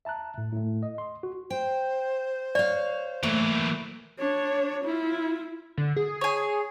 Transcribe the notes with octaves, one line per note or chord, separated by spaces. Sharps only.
E5 A5 A#5 F#6
A2
A2 A3
D#5
C6
F#4
C5 G5
C#5 D5 F5
E3 F#3 A3 A#3
D4 C#5
E4 F4
D3
G#4
C#5 G#5